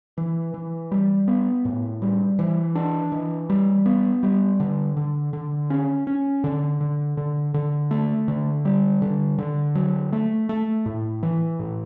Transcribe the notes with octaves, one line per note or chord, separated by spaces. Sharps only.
E3
E3
G3
B3
A2
G3
E3
D4
E3
G3
B3
G3
D3
D3
D3
C#4
C#4
D3
D3
D3
D3
A3
D3
G3
D3
D3
F#3
A3
A3
A2
E3
A2